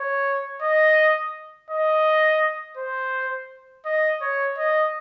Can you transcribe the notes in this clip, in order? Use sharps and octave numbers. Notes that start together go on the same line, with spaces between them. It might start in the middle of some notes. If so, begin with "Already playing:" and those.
Already playing: C#5
D#5
D#5
C5
D#5
C#5
D#5